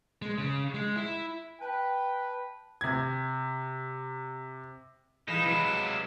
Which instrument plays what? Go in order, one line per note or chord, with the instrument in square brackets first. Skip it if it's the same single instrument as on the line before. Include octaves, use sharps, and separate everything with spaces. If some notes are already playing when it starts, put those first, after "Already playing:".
[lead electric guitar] G#3
C#3
G#3
E4
[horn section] B4 [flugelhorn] G5 [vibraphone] A5 B5
[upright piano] C3 G#6
[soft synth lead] E3 [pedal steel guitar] G#3 B4 F5 [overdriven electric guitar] D#4 [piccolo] E7
[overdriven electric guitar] C3 F#3 [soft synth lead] B5